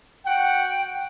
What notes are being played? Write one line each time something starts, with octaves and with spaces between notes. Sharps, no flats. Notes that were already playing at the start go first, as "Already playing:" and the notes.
F#4 F#5 G5